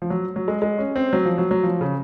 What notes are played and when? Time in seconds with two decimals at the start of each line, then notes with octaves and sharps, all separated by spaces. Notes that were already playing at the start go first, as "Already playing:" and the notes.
0.02 F3
0.10 F#3
0.36 F#3
0.48 G#3
0.62 G#3
0.78 C#4
0.96 C4
1.13 F#3
1.25 F3
1.38 F#3
1.51 F#3
1.63 F3
1.81 C#3